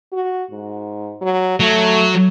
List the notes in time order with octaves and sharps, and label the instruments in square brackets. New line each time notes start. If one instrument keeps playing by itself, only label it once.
[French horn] F#4
G#2
F#3
[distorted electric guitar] F#3 [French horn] A3